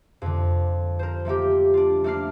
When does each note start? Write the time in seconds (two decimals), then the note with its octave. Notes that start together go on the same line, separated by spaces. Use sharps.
0.22 F2 D3
0.99 A#4 C5
1.25 F3 A3 A#3 G4
1.74 D4 F4
2.04 A3 A#3 D4 F6 C7